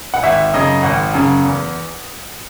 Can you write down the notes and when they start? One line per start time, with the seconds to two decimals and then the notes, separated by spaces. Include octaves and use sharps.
0.14 F#5
0.23 G#1 E5
0.54 F#2 C#3 D#5
0.83 G#1 F#5
1.14 F#2 C#3
1.44 E2